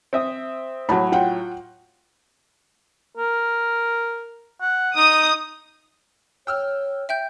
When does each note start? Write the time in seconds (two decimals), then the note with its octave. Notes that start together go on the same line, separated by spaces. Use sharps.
0.13 C4 E5 D#6
0.89 A2 F#3 A5 B5
1.12 F4 F#5 G5
3.17 A#4
4.61 F#5
4.96 D#4 D#6
6.47 C#5 G5 E6 F6
7.09 E5 G5 G6